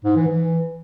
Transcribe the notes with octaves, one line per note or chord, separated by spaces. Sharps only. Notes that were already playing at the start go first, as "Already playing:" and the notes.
G#2
E3
E3